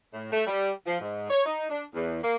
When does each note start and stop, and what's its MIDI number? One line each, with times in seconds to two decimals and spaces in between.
0.14 0.29 45
0.32 0.43 57
0.47 0.71 55
0.86 0.98 53
1.01 1.29 44
1.30 1.44 73
1.45 1.64 63
1.70 1.85 62
1.94 2.23 40
2.23 2.36 58